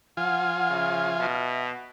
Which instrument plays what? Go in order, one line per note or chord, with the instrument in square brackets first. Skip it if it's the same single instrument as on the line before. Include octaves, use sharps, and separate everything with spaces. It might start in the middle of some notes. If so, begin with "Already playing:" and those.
[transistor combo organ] F3 F4 G#5 [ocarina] F#5 [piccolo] F6
[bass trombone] C#3 [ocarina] E5
[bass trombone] B2